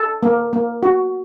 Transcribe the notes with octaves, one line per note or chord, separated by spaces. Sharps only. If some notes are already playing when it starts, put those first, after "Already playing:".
Already playing: A4 A5
A#3
A#3
F#4